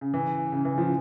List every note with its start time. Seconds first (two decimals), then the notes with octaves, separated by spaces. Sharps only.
0.01 C#3
0.14 E3
0.52 C#3
0.65 E3
0.78 F3